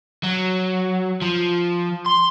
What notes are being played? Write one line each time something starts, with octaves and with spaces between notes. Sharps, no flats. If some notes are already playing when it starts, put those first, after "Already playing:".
F#3
F3
C6